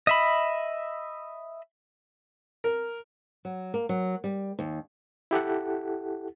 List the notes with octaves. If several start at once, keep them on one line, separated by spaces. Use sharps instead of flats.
D#5 E5 B5
A#4
F#3
A#3
F#3
G3
D#2
E4 G4 A4 F#5